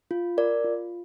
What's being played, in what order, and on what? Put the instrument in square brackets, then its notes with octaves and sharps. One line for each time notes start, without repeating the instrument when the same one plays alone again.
[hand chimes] F4
A#4 D5
F4